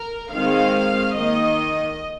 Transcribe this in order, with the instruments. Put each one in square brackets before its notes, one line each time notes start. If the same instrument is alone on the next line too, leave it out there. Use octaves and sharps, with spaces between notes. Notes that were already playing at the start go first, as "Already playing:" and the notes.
Already playing: [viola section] A#4
D#3 G#3 C4 F5
D#3 A#3 D#5